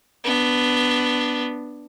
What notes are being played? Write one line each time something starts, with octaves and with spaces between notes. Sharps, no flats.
B3 D4